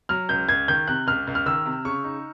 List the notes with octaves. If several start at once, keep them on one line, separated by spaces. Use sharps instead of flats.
F#3 F6
C#2 G6
C#2 G#6
D#3 G6
C3 F#6
C#2 F6
C#2
F6
D#3 E6
C3
C#3 C#6
D#4